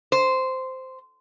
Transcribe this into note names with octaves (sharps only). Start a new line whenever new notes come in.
C5